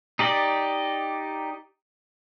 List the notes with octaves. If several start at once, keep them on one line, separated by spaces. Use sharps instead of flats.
D#4 G4 D5 D#5